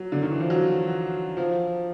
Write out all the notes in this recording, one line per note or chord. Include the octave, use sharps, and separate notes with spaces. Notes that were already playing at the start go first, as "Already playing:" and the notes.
Already playing: F#3
D3
D#3
E3
F3
F#3
F3